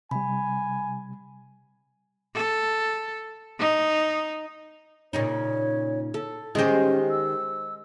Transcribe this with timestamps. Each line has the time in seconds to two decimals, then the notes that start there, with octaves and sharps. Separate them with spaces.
0.11 C3 G3 G#5 B5
2.35 A4
3.59 D#4
5.13 A#2 C#3 D#4 C#5
6.14 A4
6.55 D#3 G#3 C#4 G4 C5
7.10 E6